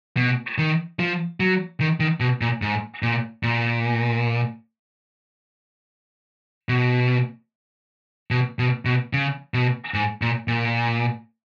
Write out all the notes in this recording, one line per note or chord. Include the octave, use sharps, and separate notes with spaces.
B2
D#3
F3
F#3
D#3
D#3
B2
A#2
G#2
A#2
A#2
B2
B2
B2
B2
C#3
B2
G#2
A#2
A#2